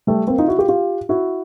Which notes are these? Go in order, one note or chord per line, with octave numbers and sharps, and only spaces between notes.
G3 A3
A#3 C4
D#4 F4
E4 F#4
F4 G4
F4 G4
E4 F#4